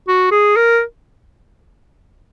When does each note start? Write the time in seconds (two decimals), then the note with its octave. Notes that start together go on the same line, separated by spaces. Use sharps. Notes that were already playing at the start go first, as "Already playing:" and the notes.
0.07 F#4
0.31 G#4
0.56 A#4